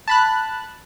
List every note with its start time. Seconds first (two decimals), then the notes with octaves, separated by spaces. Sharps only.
0.08 A5 B5 F#6